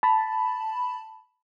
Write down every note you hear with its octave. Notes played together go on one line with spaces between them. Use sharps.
A5 B5